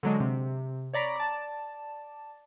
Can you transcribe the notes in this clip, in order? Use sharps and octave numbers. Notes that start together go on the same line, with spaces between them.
D3 F#3 G#3
C3
C#5 D5 A#5 B5
D5 A5